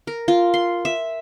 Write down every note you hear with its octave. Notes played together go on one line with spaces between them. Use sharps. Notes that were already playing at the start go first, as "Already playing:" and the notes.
A#4
F4
C6
E5